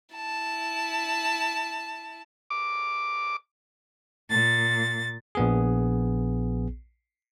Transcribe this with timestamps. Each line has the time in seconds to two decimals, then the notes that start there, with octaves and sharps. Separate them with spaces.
0.14 E4 A5
2.50 D6
4.30 A#2 A6
5.35 A#1 B3 G#4